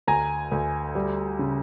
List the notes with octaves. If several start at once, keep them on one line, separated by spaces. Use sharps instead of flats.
D2 G#5 A#5
D2
G3
C#3